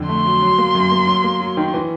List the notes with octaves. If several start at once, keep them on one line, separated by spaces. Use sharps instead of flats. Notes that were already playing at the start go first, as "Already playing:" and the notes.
Already playing: F2 D3
A3 C6
F#3
F#3
A#3
F#2
A#3
F#3
A#3
F#3
D#3
E3